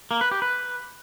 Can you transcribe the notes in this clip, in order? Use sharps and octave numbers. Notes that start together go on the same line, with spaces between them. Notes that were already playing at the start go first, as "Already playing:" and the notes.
A#3
B4
G4
B4